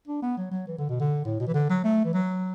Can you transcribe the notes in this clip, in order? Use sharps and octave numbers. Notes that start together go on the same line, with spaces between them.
D4
B3
F#3
F#3
E3
D3
B2
D3
A2
B2
E3
D3
F#3
A3
E3
F#3